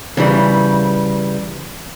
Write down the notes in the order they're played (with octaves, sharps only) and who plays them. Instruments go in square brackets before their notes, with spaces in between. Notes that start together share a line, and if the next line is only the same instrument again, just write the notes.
[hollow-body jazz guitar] C#3 E3 G3